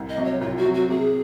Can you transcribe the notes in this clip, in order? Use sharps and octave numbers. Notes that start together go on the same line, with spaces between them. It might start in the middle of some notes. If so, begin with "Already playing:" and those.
Already playing: C2
D#5
C3 F#3
C#5
C2 F4
F#4
C3 F#3
F#4
C3 G#4